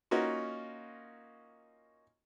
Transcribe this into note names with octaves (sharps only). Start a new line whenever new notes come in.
A#3 C#4 D#4 F4 F#4